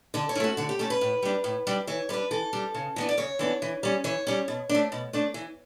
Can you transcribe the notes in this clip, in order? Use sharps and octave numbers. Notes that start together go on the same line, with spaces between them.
D3 A4
C#5
A3 C#4 E4 F#4
D3 F#4
G4
A3 C#4 A4
B4
A2
G3 D4
A2
G3 D4
E3 C#5
G3 D4 B4
E3 A4
G3 D4
C#3
E3 B3 D4
D5
C#3 C#5
E3 B3 D4
E3
G3 C#4
E3 C#5
G3 C#4
B2
D4
A3
B2
A3 D4
E3